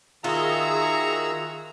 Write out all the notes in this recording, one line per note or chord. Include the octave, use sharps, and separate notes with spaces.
D#3 F4 F#4 G#4 E5 A#5 E6